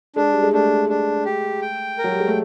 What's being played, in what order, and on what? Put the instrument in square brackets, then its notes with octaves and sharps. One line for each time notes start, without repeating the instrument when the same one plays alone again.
[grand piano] G#3 [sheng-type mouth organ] D4
[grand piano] G3
G#3
[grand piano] A3 [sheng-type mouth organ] D4
[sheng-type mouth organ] D4
G4
G5
A#4
[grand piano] F#3
G3
G#3
A3